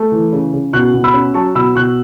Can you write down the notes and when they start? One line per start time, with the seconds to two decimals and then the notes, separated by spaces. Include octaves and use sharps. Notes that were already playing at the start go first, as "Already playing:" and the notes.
Already playing: A3
0.12 E3
0.33 C#3
0.53 C#3
0.73 B2 C#6 F#6
0.93 B2
1.04 B5 E6
1.14 C#4
1.34 F#3 A5 C#6
1.55 B2 B5 E6
1.75 B2 C#6 F#6